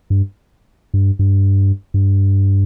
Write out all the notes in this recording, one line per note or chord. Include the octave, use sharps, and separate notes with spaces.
G2
G2
G2
G2